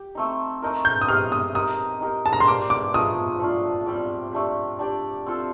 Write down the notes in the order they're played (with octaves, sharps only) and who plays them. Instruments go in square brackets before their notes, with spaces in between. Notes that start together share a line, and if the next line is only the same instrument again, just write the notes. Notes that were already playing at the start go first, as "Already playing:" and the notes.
Already playing: [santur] G4
A3 C4 D#4
A3 D#4 A#4
[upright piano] G6
D#6
[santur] D#4 G4 C5 D#5 [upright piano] F6
[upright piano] D#6
[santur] D#4 G4 A#4 [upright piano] D#6
[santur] D#4 G4 A#4
[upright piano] A5
A#5
C6
[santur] A#3 D4 G4 C5 [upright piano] D6
[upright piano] D6
[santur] F3 A3 D#4 G4 [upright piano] D#6
[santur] A3 D4 F4
G3 C4 G4 D5
A3 D4 G4
D4 G4 D5
C4 F4 A4